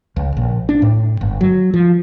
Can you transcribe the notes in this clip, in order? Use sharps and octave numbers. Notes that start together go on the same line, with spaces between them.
C#2
A#1
D4
A2
G1
F#3
F3